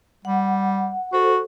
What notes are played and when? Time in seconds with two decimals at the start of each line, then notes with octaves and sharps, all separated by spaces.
0.25 G3 F#5
1.13 F#4 A4 C5